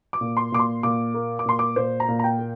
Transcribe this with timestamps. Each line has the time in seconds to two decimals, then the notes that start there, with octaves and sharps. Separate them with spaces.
0.13 D6
0.21 A#2
0.37 C6
0.52 A#2 D6
0.59 C6
0.83 A#2 D6
1.14 A#3
1.39 D6
1.46 A#2 C6
1.59 D6
1.76 A#2 C5
2.00 A#5
2.08 A#2
2.19 A#5
2.24 G5
2.39 A#3